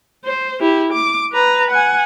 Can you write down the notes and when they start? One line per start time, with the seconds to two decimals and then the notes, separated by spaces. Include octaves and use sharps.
0.25 C5
0.61 E4 G4
0.93 D6
1.33 B4 A#5
1.70 F#5 G#5